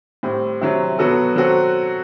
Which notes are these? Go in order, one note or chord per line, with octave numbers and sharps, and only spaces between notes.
A2 G3 C4
C3 F#3 C4 E4
B2 F#3 B3 F#4 A4
F#3 C4 F#4 A4